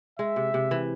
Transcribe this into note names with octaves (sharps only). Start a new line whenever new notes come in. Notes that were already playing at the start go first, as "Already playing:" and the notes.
G#3 E5
C3
C3
E3